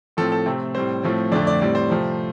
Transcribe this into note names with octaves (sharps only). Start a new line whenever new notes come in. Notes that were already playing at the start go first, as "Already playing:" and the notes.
A2 F3 C4 A4
A4
C3 A3 C4
A2 G3 C4 C5
A2 F3 A3 C4
F2 D3 A3 C4 D5
D5
A2 G3 C4 D5
C5
C3 F3 A3